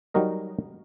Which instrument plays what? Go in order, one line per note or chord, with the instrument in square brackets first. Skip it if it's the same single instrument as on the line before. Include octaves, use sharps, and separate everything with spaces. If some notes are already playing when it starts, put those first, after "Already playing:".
[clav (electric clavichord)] F#3 G3 D#4 F#4 A#4 D#5